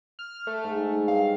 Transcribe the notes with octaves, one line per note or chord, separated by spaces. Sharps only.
F6
A3
G#2
G2 F5